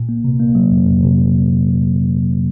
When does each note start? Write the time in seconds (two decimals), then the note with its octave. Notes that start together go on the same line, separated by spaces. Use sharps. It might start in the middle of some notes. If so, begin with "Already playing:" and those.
Already playing: A#2
0.09 A#3
0.25 C3
0.39 A#3
0.55 F#3
0.71 F2
0.87 F2
1.03 C3